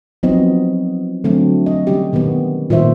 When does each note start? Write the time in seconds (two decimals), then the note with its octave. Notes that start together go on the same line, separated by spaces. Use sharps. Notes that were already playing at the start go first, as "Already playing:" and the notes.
0.23 F3 F#3 B3 C4 D#4 D#5
1.24 D3 F#3 A3 C4 D4
1.66 D#5
1.87 D3 G3 C#4 G4
2.13 B2 D#3 G3 B3
2.70 A#2 D#3 G3 C5 E5